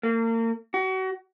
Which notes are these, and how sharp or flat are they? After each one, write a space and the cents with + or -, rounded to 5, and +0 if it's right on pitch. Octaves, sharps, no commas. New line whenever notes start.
A#3 -35
F#4 +35